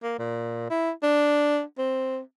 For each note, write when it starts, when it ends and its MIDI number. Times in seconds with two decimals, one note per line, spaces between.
0.03 0.16 58
0.19 0.66 46
0.70 0.91 64
1.03 1.62 62
1.78 2.19 60